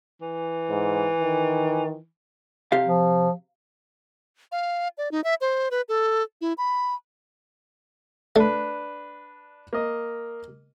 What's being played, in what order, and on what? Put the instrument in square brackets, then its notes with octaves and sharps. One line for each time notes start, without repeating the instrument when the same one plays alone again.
[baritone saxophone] E3
[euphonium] G#2
D#3
[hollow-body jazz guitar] C3 G4 F5
[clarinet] F3
[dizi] F5
D5
D#4
E5
C5
B4
A4
E4
B5
[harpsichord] A3 [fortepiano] D4 B4
[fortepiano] A#3 D#5